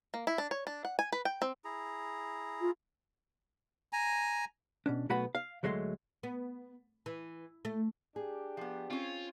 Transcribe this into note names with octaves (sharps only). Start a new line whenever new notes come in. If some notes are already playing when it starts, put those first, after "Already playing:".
A#3
E4
D4
C#5
D4
F#5
G#5
B4
G5
C4
E4 G#4 A#5
F4
G#5 A#5
B2 C#4 D4
B1 A3 B3 F#4 B5
F5
D2 F#3 G#3 A3 C6
B3
E3
A3
D4 G4 G#4
F3 B3
C4 C#4 F4 C#5